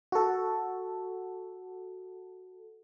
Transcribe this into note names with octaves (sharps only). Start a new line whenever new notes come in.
F#4 A4